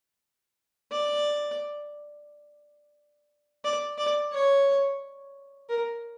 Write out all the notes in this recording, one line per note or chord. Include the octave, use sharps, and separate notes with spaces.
D5
D5
D5
C#5
A#4